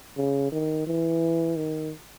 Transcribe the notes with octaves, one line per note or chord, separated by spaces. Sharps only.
C#3
D#3
E3
D#3